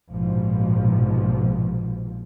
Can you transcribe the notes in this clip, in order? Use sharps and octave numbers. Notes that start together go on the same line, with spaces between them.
A#1 G#2 B2 F3